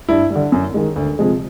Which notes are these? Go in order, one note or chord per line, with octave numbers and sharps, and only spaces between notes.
G2 E4
G3
D3
F#2
D#3 G#3
D2
C3 F3 G#3